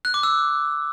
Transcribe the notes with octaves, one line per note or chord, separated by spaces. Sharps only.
F#6
D6
E6